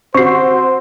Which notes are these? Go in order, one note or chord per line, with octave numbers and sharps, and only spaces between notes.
C4 F#4 C5 C#6 C7